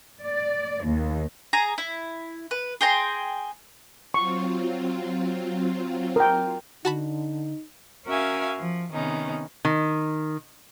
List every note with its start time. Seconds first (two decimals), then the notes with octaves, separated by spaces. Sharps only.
0.23 D5
0.86 D#2
1.53 G#4 A#5
1.78 E4
2.51 B4
2.81 G#4 G5 A#5 C6
4.14 F#3 C4 F4 C#6
6.16 A#4 G5
6.85 D3 D#4 F#4 A5 B5
8.06 C#4 F#4 A#4 E5 F5 G#5
8.59 F3
8.92 C3 D#3 B3 C#4 D#4
9.65 D#3